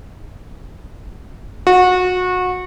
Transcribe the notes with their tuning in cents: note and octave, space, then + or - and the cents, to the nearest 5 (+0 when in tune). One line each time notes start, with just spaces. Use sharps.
F#4 -25